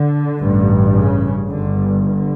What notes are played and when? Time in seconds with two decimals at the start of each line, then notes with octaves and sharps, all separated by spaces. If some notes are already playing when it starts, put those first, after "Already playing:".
Already playing: D3
0.40 A1 G2
0.94 C#3
1.48 G1 G2 D3
2.03 D3